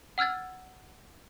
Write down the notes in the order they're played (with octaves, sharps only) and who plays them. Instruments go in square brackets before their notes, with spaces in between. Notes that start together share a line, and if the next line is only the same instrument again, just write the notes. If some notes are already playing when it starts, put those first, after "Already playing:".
[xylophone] F#5 E6 F6 G#6 A6